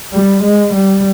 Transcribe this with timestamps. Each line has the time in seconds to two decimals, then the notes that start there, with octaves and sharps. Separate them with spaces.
0.13 G3
0.43 G#3
0.74 G3